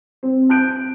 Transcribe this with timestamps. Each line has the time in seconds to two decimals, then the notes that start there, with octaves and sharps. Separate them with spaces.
0.23 C4
0.49 A5 F#6 G6 D7